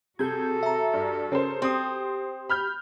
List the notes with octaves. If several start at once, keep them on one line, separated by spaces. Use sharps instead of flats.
C3 F#4 G#4 A4 G6 G#6
E5 A#5
G2
C#3 C#4 A#4 C5
C4 G4 C5 D#6
B5 F6 G6